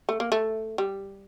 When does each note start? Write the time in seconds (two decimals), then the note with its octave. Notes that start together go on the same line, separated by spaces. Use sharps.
0.09 A3
0.20 A#3
0.32 A3
0.78 G3